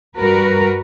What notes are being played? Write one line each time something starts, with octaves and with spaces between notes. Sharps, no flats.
G2 G3 F#4 A#4 B4